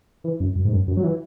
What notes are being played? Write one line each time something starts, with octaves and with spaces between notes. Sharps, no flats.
E3
F#2
F#2
G#2
F#2
F#2
F#3
E3